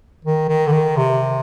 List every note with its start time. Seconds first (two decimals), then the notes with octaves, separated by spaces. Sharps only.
0.24 D#3
0.48 D#3
0.66 D3
0.72 D#3
0.96 C3